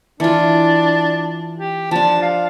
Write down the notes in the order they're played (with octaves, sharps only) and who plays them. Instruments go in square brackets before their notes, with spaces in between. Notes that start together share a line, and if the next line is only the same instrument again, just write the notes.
[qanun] E3 F4 [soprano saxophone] D4
[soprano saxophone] G4
[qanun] F3 D4 [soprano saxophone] A5
[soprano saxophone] F5